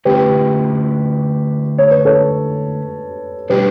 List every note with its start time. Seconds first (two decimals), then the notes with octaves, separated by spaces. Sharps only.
0.05 D3 A3 C#4 E4 G4 B4
1.78 C#5
1.91 B4
2.05 A4 C#5
3.50 B2 G3 D4 G4 B4